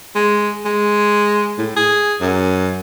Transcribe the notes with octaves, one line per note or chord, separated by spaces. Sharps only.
G#3
G#3
A2
G#4
F#2